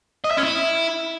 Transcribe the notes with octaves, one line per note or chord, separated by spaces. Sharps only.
D#5
E5
C#4
E4